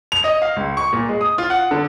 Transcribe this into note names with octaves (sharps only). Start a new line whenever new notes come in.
F7
D#5
F5
C#2
C#6
A#2
G#3
D#6
F4
F#5
D3